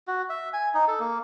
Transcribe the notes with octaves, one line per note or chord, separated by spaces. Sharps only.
F#4
E5
G#5
D#4
A4
A#3